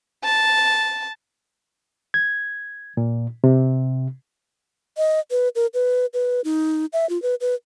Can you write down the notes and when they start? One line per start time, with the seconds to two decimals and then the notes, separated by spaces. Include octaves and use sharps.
0.24 A5
2.14 G#6
2.97 A#2
3.44 C3
4.97 D#5
5.31 B4
5.55 A#4
5.74 B4
6.14 B4
6.44 D#4
6.93 E5
7.09 F4
7.22 B4
7.41 B4